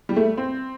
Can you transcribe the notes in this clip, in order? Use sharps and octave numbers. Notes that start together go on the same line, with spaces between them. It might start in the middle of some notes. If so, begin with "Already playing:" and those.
G3
A3
C4